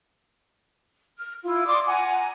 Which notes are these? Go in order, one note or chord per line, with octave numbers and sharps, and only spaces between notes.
F6
E4 F4
D5 C6 D6 D#6
F#5 G#5 A#5